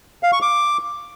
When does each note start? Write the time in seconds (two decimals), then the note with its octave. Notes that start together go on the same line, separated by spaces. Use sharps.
0.23 F5
0.32 C#6
0.42 D6